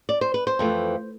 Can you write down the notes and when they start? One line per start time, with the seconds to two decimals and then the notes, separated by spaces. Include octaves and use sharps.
0.09 D5
0.21 C5
0.34 B4
0.47 C5
0.59 F2 E3 A3